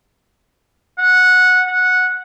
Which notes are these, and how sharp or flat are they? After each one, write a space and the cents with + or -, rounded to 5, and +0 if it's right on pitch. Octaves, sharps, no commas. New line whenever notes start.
F#5 -15
F#5 -10